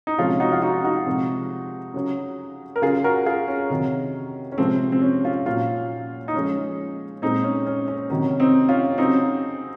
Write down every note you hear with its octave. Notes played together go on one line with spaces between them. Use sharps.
D#4
C3 F3 G#3 C#4 F4
D#4 F#4
F4
D#4 F#4
D#4 F#4
C3 F3 G#3
C#3 F#3
A#4
C#3 F#3 F4 G#4
F#4 A#4
F4 G#4
C#4
C3 D#3 F#3
C#4
C3 F3 G#3 C4
C4
C#4
C#4 F4
A#2 F#3 C#4 F4
D#4
C#3 F3 G#3 C#4
A#2 G#3 C4 D#4
C#4
C#4
C#4
C3 D#3 F#3 C#4
C4 D#4
C#4 F4
C#3 F#3 C4 D#4